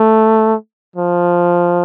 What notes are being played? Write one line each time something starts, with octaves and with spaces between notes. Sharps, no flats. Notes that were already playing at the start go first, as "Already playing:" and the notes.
Already playing: A3
F3